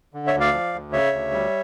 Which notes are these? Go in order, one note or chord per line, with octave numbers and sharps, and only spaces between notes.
D3
C#5 E5
D2
D5 F5
F3
D2
C#3 C#5 E5
D2
G3